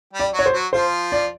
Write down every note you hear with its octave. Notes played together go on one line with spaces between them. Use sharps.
G3 G4
D5
F#3 F#4
C#5
C5
F#3 F#4
F3 F4 C5
D5